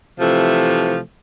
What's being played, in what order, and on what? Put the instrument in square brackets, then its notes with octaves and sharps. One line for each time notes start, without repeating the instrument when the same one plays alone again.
[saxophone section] C3 E3 F3 A3